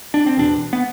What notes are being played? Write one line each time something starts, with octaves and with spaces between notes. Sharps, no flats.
D4
C4
E2 B2 D4
B3